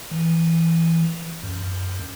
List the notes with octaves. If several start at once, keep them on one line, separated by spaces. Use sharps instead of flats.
E3
F#2